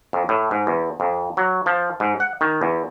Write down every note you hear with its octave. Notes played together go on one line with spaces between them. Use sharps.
F2
A2
G#2
E2
F2
F#3
F3
G#2
F#5
D#3
E2